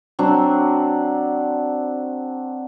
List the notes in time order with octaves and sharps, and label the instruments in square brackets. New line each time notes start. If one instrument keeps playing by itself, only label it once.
[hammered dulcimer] F#3 C4 D4